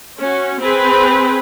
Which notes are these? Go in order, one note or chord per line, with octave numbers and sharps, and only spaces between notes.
C#4 F#4
C4 G#4 B4